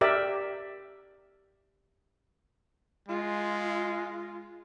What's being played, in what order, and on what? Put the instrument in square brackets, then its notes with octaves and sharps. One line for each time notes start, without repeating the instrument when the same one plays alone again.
[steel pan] G4 A#4 D5 E5
[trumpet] G#3 [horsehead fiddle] F4